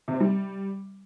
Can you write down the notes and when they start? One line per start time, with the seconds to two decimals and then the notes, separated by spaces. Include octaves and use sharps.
0.08 C3
0.14 C4
0.20 G3